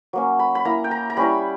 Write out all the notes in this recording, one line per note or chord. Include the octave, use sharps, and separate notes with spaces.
F#3 A#3 C#4
B5
B5
A#3 E4 A#5
G5
A#5
A#5
G3 C#4 E4 B5